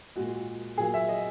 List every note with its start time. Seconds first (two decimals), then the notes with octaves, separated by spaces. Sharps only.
0.16 A#2 G#3 F#4
0.78 A#2 F#3 A#3 G#4
0.94 E5
1.09 D#5